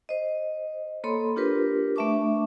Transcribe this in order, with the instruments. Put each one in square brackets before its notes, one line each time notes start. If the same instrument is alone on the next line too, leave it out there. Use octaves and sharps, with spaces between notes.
[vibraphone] C5 D#5
A#3 A4 C#5 B5 C6
D4 F4 G4 A#4 B4
A3 D4 E5 A5 C#6 D6